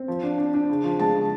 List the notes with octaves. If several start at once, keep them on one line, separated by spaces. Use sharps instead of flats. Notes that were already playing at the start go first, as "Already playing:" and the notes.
Already playing: C4
F3
D4
D4
D4
C#3
F3
G#3 A5
C#3